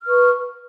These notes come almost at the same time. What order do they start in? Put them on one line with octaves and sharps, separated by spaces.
F6 B4 C#6